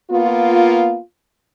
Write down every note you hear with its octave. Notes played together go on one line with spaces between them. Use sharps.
A#3 B3 F4